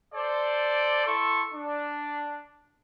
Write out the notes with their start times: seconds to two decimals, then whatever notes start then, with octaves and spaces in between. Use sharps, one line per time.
0.15 A4 C5 D5
1.06 E4 A4 C6 C#6
1.53 D4